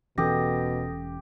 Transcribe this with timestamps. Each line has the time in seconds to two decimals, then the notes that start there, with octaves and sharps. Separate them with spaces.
0.18 E1 B2 E3 C#4 G4 A4 D#6 A#6